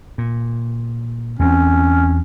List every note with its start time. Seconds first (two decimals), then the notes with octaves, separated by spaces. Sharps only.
0.18 A#2
1.39 E2 A#3 C4 C#4